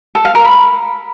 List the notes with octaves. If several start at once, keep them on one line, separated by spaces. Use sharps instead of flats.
A4
F5
A#4
B5